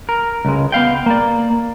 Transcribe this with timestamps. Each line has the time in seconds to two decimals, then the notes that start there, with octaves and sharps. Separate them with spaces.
0.09 A#4
0.45 C#2 G#3
0.72 B3 F5 G5
1.06 A#3 D5